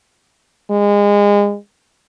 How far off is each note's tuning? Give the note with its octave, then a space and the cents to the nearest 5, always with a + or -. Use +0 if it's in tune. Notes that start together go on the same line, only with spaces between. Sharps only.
G#3 -30